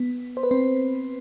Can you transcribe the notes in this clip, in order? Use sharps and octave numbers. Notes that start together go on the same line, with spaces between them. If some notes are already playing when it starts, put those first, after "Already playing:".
Already playing: B3
C5
B4
C4 C5